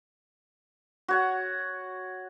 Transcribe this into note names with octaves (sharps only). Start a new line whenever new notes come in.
F#4 C#5 F#5